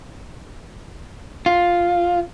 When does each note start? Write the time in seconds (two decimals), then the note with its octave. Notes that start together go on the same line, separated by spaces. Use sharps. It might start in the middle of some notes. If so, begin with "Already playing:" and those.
1.46 F4